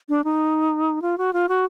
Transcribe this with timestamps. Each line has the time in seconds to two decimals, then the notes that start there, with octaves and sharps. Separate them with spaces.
0.09 D4
0.24 D#4
1.02 F4
1.18 F#4
1.33 F4
1.49 F#4